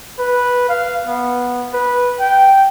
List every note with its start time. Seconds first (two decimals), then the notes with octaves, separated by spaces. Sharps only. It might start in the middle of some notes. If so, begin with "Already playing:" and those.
0.19 B4
0.69 F5
1.07 B3
1.73 B4
2.19 G5